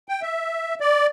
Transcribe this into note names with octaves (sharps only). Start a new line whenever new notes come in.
G5
E5
D5